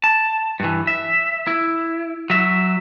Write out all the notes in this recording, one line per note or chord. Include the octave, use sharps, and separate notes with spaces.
A5
G2 E3
E5
E4
F#3 E5